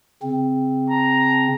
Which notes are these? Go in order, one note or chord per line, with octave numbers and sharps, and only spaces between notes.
C#3 C4
A5 A#5